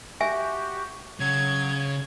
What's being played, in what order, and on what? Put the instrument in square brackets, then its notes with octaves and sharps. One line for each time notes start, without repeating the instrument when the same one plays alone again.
[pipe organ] F#4 G4 [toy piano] E5 G#5
[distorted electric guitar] C#3 [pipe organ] F#3 [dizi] G#6